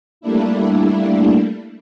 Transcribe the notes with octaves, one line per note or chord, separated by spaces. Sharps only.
G3 A3 A#3 D4 E4